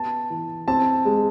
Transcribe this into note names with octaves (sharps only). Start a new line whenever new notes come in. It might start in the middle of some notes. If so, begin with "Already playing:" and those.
Already playing: B3 A5
E3
C4 A5
G#3